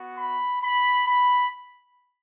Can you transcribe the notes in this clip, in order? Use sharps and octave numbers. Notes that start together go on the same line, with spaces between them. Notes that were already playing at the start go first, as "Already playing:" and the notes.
Already playing: B3 F#4
B5
B5
B5